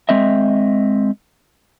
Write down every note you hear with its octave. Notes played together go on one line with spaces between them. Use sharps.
G#3 C4 D#5 E5